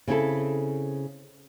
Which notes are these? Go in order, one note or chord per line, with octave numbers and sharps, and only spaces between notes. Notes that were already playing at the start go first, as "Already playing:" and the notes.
C#3 C4 E4 A4